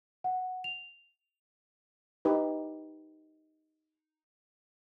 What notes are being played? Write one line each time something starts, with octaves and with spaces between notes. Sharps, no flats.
F#5
F7
D#4 G4 B4